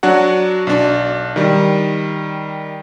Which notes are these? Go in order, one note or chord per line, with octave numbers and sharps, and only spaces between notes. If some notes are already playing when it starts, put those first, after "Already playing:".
F#3 D4 F#4 F#5
B1 D4
D#3 G3